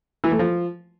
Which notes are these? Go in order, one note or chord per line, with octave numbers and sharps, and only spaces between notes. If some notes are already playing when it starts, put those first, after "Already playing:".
E3
A3
F3